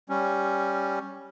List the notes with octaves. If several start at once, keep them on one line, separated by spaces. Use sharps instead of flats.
G3 C#4